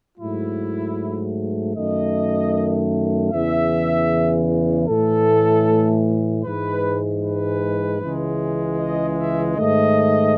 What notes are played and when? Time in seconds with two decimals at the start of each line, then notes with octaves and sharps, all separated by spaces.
0.18 G#2 F#3 A3 E4
1.75 F#2 D#3 A3 D#5
3.31 E2 C#3 E3 E5
4.88 A2 E3 A3 A4
6.44 G#2 E3 G#3 B4
7.23 B4
8.01 C#2 C#3 E3 G#3
8.78 D#5
9.18 E5
9.56 G#2 D#3 A3 D#5